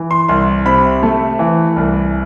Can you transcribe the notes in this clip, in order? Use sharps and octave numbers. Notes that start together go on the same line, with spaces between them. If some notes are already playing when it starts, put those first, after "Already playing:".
Already playing: E3
C6
C2 C6
C3 B5
A3
E3
C2